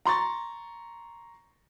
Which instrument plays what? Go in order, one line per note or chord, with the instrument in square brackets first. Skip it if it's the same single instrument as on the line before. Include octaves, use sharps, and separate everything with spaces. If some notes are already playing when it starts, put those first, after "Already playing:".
[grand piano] A#5 C6 C#6 A6